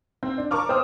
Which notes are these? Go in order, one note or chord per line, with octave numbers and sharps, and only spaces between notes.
C4
D4
A#4 A5 C#6 D6 F6
B3 C5 G5 D#6 F6